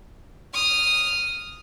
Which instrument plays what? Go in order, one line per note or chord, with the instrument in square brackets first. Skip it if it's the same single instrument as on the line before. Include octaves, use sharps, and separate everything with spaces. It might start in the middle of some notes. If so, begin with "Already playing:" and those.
[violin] D#6 F6